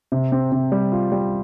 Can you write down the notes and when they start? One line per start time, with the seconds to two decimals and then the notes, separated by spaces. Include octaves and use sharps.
0.12 C3
0.32 C4
0.52 C3
0.72 G3
0.92 F4
1.12 G3